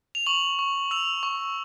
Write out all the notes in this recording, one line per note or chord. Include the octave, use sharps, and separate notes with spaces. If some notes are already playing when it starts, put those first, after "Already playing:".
F7
C#6 F#7
C#6
E6 F7
C#6